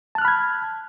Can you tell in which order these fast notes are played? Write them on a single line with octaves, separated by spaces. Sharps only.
A5 F#6 F6 B5 G#6